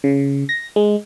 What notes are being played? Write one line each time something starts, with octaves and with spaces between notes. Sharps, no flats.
C#3
A#6
G#3